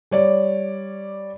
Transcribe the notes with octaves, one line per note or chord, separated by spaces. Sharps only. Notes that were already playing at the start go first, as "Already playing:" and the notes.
G3 C#5 D5